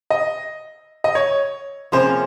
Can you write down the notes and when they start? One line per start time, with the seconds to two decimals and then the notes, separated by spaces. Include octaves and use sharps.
0.10 D#5
1.04 D#5
1.15 C#5
1.92 C3 F3 A#3 C#4 G#4 C5